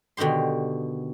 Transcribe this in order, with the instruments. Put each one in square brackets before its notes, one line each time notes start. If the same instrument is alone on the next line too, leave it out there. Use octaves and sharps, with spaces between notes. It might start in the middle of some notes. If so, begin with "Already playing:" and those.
[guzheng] B2 D3 D#3 G4 C6